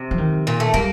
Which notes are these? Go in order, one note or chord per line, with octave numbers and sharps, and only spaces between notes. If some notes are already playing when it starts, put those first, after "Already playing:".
Already playing: C3
F3
D#3
A#2
A3
G3 A#3